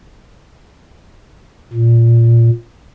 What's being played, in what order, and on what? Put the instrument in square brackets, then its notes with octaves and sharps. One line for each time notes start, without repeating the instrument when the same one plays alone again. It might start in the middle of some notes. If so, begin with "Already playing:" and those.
[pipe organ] A#2